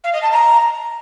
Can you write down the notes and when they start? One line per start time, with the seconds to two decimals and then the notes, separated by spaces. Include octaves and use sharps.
0.04 F5
0.13 D#5
0.22 A5
0.32 A#5